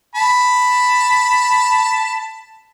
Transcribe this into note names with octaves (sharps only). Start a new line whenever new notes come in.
A5 B5